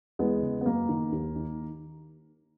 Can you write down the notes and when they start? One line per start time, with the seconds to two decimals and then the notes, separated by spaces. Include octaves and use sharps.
0.19 E2 G#3 B3
0.42 C#3
0.61 B3
0.65 F#2 A#3
0.89 D#3
1.12 D#2
1.35 D#3